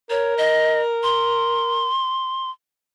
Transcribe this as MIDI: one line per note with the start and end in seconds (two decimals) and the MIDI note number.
0.10 1.87 70
0.10 0.34 73
0.38 0.81 75
1.03 2.50 84